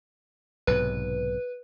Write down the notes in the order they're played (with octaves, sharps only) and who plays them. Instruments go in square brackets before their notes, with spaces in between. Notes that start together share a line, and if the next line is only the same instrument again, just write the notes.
[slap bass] B1 G#2 C3 [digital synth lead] B4